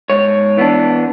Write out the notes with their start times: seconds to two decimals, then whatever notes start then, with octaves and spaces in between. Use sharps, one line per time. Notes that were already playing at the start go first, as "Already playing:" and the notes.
0.10 G#2 C#5
0.57 E3 B3 D4